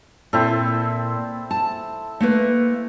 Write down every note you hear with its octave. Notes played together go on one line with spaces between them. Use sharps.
A#2 C4 E4 A4
A5
A3 A#3 B4